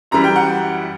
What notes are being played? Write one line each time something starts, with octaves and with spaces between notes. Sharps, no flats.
F#2 E3 G3 A#5
G5
F#5